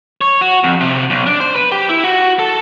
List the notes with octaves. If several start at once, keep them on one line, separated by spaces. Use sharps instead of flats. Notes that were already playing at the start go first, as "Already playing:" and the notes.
C#5
F#4
F2
C3
B1
D4
C5
B4
G4
E4
F#4
A4